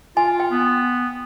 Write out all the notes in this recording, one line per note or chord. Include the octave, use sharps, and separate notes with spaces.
F4 G#5
G5
B3